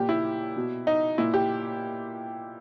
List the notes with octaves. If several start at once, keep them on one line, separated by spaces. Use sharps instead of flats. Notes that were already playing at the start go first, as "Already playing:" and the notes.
Already playing: A#2 G4
E4
B2
D#4
A#2 E4
G4